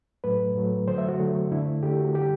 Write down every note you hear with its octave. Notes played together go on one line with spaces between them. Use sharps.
A2 F#3 A3 B4
A2 F#3 A3
D3 F#3 A3 C5
E5
F#4
D3 F#3 A3
D3 A3 E4
D3 A3 G4
F#4
D3 G3 G4